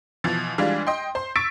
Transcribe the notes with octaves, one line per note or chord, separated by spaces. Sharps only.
B2 E3 F3 A6
E3 G3 G#3 D4 F4
D#5 G5 C6
C5 C6
C#6 E6 A6 B6 D7